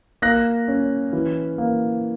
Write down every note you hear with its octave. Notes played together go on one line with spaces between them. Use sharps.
A#3 F#6 A#6
C#4
E3
A#3